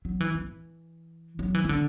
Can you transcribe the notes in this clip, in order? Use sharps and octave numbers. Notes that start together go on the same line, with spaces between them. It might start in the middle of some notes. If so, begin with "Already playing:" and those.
F#3
E3
E3
F#3
E3
E3
D3